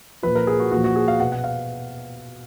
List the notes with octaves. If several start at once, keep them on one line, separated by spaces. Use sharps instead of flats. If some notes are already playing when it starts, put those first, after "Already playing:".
A#2 F3 B4
A#4
G#4
F#4
A#2 F3 F#4
F#4
G#4
F5
B2 F#5
F#5
F5